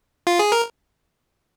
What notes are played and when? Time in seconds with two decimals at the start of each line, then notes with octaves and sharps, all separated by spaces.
0.27 F4
0.39 G#4
0.52 A#4